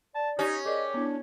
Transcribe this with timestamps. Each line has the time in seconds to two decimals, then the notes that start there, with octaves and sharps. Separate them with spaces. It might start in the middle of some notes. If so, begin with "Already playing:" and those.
0.15 D5 A5
0.39 C#4 D#4 G4
0.65 G4 G#4 A#4 D5 D#5
0.94 B3 D4 E4